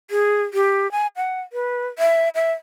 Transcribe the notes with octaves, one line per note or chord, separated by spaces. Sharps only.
G#4
G4
G#5
F#5
B4
E5
E5